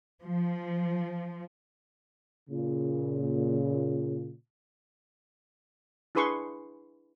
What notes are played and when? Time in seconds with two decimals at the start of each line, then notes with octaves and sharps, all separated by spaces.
0.23 F3
2.50 A#2 C#3
6.15 D4 E4 G#4 B4 C6 C#6